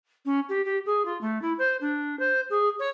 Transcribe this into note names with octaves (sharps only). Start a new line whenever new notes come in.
C#4
G4
G4
G#4
F4
A3
E4
C5
D4
C5
G#4
C#5